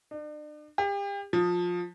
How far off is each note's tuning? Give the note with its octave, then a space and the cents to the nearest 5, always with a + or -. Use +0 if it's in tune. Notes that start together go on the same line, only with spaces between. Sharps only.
D4 +40
G4 +35
F3 +20